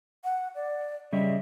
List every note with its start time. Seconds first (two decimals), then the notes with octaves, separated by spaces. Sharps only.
0.24 F#5
0.55 D5
1.13 C#3 G3 D#5 E5